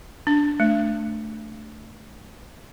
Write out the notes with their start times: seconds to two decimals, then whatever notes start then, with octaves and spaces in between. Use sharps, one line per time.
0.27 D4
0.60 A3